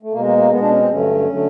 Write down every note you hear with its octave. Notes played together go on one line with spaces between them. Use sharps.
A3
B2 G#3 A#3
A#3
A#3
B2 G#3 B3
D4
C#4
C4
G2 D3 F#3 A3 C#4
D3 F#3 A3